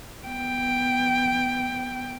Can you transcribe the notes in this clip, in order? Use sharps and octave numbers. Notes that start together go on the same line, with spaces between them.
B3 G5